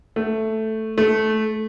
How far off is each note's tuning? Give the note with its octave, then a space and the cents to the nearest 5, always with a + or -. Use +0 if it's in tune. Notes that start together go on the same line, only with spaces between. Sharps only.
A3 +0
A3 -15